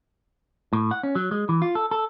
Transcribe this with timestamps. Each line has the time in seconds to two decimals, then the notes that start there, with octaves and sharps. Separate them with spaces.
0.73 A2
0.91 F#5
1.03 C#4
1.15 F#3
1.31 G#3
1.49 E3
1.62 F4
1.75 A4
1.91 A4